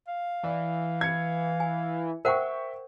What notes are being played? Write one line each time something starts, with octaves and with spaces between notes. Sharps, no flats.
F5
E3 D5
G#6 C#7
G#5
A#4 C5 E5 F#5 G5 C#6